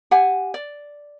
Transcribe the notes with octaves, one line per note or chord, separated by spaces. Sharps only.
G4 F#5 G#5
D5